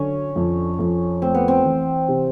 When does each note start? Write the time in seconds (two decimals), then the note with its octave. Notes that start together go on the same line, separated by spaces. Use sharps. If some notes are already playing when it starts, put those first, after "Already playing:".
Already playing: D3 F#3 C#4
0.36 F2
0.79 F2
1.22 A3 C4
1.35 B3
1.48 C4
1.65 E3
2.08 C3